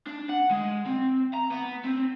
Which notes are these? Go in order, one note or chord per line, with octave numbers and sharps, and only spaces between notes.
D4
F#5
G#3
C4
A#5
B3
C4